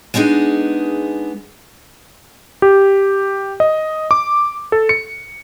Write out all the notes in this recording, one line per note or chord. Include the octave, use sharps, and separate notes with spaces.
G#3 B3 D4 D#4 G#4
G4
D#5
D6
A4
C#7